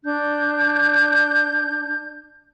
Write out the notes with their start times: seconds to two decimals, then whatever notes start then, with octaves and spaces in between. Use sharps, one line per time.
0.03 D4 G6